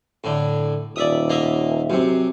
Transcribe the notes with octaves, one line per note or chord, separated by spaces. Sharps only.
A2 D3
D#1 D5 E5 D#6
A#3 D#5 E5
F#2 C3